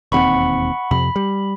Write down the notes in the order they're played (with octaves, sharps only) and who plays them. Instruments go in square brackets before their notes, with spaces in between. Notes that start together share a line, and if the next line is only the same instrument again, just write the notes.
[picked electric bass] E1 D#2 C4 [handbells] F#5 B5 C#6
[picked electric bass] F2 C3 [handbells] B5
[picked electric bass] G3